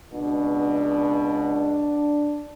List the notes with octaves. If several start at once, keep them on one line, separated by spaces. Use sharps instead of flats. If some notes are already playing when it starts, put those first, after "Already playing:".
C#2 B2 D4